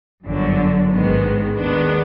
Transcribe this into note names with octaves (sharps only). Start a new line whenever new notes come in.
G1 F#2 D3 F#3
A1 G#2 D#3 G#3 B3
D#2 D#3 G#3 B3 D4